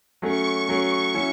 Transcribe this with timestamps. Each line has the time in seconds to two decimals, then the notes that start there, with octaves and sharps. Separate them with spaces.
0.22 F#3 A3 C#4 C#6
0.68 F#3 A3 C#4 C#6
1.14 F#3 C#4 E4